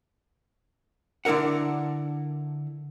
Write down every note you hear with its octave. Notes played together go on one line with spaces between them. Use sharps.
D3 D4 E4 A#4 F#5